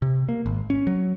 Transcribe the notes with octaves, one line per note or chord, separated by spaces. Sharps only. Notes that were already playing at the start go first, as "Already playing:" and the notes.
C3
A#3
G#1
C#4
F#3